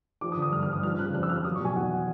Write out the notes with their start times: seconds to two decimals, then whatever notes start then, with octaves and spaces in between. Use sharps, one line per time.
0.21 F3 D6
0.32 D#6
0.37 D3
0.42 D#6
0.52 G2 F6
0.63 F6
0.67 G2
0.73 D#6
0.83 F3 F6
0.98 C#3 F#6
1.14 F2 F#6
1.23 E6
1.29 F2 F6
1.44 F#3 D#6
1.56 C#6
1.60 B2 G#5
1.76 E2 F#5